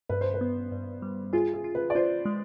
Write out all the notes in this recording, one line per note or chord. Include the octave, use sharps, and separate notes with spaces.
G2 B4
C5
B4
B3
G2
G3
F4 G#4
G#4
F4
B4
D5
F4 C5
G#3